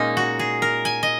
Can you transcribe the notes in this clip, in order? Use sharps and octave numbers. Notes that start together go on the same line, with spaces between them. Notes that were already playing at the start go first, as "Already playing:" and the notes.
Already playing: A#2 G#3 A#3 C#4 D#4
F#4
G#4
A#4
G#5
D#5